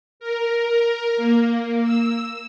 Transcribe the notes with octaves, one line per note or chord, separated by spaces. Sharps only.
A#4
A#3
E6